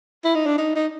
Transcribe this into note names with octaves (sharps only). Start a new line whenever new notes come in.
E4
D#4
D4
D#4
D#4